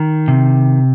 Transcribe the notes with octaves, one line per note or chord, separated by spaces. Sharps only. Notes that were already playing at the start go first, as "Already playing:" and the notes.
Already playing: D#3
C3